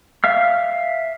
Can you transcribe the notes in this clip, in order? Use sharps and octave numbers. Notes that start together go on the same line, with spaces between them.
E5 F5 F6